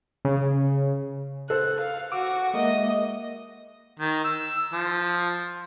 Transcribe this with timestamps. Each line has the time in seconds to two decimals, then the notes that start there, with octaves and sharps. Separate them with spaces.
0.25 C#3
1.50 A4 C5 F#6
1.81 F5
2.12 F#4 D6 E6
2.54 G#3 A#3 D#5 E5
3.99 D#3
4.24 E6
4.73 F3